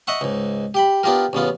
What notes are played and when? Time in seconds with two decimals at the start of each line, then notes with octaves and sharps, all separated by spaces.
0.07 D#5 E5 F#5 C#6
0.21 C#2 G#2
0.74 G4 G5 B5
1.03 B3 D4 F4 G4 A#4
1.33 A1 C#3 B3 F4